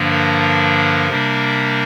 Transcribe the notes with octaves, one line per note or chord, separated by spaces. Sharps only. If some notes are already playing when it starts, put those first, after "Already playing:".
Already playing: G2 D3 F3 A#3 D4
A#4
C3 G3 A#3 D4